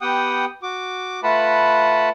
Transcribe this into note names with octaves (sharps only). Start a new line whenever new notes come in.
B3 G4 F#5 G5 D#6
F#4 D6
A3 F4 B4 F#5 A5 B5